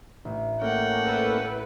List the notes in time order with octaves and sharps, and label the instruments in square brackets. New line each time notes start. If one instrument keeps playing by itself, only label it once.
[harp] A1
[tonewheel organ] A3 A#3 C#4 [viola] F#5 G5
[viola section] E4 A4 B4